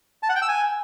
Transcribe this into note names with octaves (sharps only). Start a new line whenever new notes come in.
A5
F#5
G5
E6
G#5